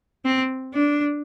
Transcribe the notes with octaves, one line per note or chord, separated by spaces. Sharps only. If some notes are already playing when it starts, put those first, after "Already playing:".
C4
D4